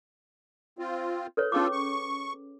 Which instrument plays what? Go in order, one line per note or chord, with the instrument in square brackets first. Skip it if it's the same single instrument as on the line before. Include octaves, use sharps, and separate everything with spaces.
[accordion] C4 F4
[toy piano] A4 B4 C#5
[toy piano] C#4 G#4 D6 [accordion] F4 A4
[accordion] C#6